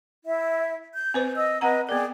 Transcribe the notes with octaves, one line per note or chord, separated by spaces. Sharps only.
E4 E5
G6
C4 B4 C5
D#5 E6
C4 B4 D#5 F#5 A#5
B3 G#4 A#4 D5 G5